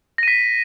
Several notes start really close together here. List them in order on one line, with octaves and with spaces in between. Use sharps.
A#6 D#7 B6